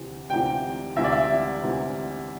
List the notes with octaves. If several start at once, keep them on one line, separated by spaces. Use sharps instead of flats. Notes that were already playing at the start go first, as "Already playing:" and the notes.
Already playing: D2 C3 E3
D2 C3 E3 G5
D2 C3 E3 E5
D5
E5
D2 C3 E3